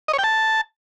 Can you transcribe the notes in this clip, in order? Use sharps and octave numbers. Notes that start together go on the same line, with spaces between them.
D#5
C#5
G5
A5